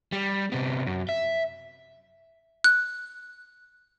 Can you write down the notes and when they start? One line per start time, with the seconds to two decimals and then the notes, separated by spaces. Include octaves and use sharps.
0.12 G3
0.52 C3 B3
0.87 F#2
1.09 E5
2.64 F#6